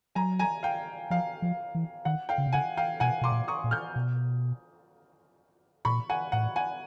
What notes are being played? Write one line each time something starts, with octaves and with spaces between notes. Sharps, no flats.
F#3 G#5 A#5
G#5 A#5
F5 G5
F3 F5
F3
E3
D#3 F#5
F5 G5
C#3
C3
C#3 F#5 G#5
F5 G5
B2 F#5 G#5
B2 C6 D6
A#2
C#6 D#6
A#2
F6 G6
B2
A#2 B5 C#6
F#5 G#5
A2 F#5
F#5 G#5